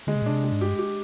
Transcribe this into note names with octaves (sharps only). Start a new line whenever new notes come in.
D3 G#3
C3
A#2
C3 D4
G#3
G#2
G2 G4
G4